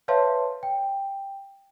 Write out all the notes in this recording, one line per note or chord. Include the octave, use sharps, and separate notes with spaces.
B4 C#5 E5 F5 A5 C6
G5